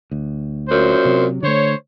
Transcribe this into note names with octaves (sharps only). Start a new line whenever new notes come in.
D2
F#2 A#2 C5
C3 F#3
D3 A3 C5 C#5